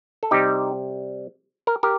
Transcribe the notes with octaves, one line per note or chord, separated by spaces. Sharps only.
A4
C3 G3 D#4 G4
A#4
G4 A#4